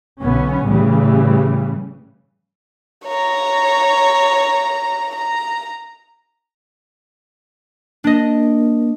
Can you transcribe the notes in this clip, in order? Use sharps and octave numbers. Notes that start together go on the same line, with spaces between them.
B1 D3 B3 C#4
A2 C#3 E3 G3
C#5 A#5
A#5
A#3 D4 D#5